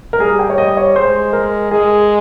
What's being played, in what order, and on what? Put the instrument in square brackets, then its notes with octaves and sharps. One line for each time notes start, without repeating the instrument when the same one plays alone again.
[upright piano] A#4
[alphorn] G3 [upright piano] G#4
[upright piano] G5
C#5
D#5
C#5
[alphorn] G#3 [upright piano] C5
[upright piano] A#4
[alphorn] G#3 [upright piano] G#4